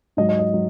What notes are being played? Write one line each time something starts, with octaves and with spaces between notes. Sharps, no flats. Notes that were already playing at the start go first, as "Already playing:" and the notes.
G#2 F#3 D#5
D#5
D#5
F#3